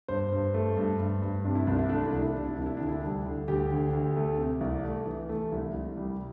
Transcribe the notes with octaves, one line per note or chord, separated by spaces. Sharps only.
G2 C5
G2
A3
G2
G2
G2
C3 D4
E4
C2 D4
E4
A3 D4
E4
C2 D4
E4
C3 D4
E4
C2 D4
E4
D2 D4
E4
G3 D4
D3
D2 G4
D3
D2
A3
C3
C2
A3
E3
A3
C2 E4
C2
G3